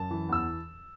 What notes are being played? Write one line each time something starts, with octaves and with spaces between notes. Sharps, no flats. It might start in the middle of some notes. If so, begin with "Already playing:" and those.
Already playing: F#2 A5
E3
E2 E6